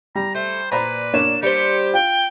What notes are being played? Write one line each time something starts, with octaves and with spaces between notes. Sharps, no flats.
G3 A#5
A3 C5
A#2 B4 C5 D5 A#5 B5
A#3 D4 C#5 E7
G3 G4 C5 C#7
F4 G5